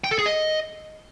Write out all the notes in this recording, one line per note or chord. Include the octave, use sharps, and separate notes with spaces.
G5
A4
G#4
D#5